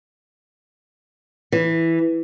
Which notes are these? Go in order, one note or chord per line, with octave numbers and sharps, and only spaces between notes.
E3